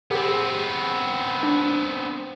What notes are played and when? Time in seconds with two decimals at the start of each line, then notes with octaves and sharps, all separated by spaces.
0.11 B3 C4 G4 G#4
1.43 D4